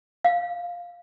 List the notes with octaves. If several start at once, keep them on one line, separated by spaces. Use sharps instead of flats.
F5